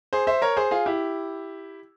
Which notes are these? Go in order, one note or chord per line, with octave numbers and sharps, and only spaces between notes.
G#4 C5
C5 E5
A#4 C#5
G#4 C5
F4 G#4
E4 G4